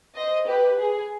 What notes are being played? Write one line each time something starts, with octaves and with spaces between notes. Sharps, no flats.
C5 D#5
G4 B4
G#4